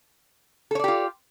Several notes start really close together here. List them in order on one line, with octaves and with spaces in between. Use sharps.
A4 C#5 D5 G4 F4